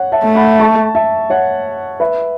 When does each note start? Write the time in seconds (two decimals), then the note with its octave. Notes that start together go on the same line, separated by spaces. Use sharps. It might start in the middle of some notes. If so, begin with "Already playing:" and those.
Already playing: C#5 F#5
0.12 E5 A5
0.24 A3
0.35 F#5 B5
0.59 A5 C#6
0.95 E5 A5
1.30 C#5 F#5
2.00 B4 E5